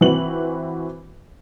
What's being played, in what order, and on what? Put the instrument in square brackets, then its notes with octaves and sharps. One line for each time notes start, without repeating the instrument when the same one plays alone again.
[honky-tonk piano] E3 C4 F#4 B4 F#7